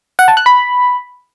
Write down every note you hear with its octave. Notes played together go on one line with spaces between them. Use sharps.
F#5
A5
F#6
B5